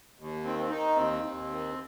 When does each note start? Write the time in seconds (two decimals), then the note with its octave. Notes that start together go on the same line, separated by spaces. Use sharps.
0.19 D#2
0.44 D#3 C4
0.59 C4
0.70 D#3 D#4
0.96 D#2 C4
1.23 D#2
1.50 D#3